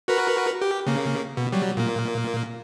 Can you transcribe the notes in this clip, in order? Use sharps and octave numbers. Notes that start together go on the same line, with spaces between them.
F#4 A#4 B4
G4
C#3 A#3
B2
F#3 G3
A#2 A#3